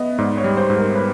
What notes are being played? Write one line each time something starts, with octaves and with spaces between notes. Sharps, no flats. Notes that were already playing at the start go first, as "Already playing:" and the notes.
Already playing: B3 D#5 E5
G#2 D5
C#5
G3
C5
G#2
A#4
B4